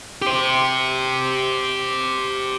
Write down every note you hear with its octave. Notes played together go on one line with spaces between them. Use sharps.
G4 C5